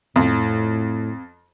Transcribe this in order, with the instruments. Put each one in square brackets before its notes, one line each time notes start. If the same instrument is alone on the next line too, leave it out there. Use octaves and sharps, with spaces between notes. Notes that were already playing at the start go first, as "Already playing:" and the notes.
[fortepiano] F2 [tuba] A2